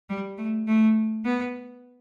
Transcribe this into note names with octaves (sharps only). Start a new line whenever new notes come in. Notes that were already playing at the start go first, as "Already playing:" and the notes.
G3
A3
A3
B3